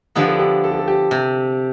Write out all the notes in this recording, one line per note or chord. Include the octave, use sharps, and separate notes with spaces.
D3 F3 B3 E4 G4
A4
G4
A4
G4
A4
G4
C3